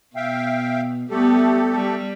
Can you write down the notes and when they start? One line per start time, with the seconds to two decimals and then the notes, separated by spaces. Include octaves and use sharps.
0.16 B2 E5 F5 G5
1.10 G3 A3 B3 G4 A4
1.72 G3